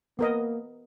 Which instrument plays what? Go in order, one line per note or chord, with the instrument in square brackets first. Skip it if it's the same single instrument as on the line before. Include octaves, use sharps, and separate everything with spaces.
[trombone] A#3 [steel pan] B3 A#4 D#5